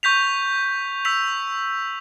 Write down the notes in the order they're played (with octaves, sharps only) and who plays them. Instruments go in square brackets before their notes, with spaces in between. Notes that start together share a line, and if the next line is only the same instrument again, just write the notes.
[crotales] C#6 G6 B6 F7
E6 B6 F7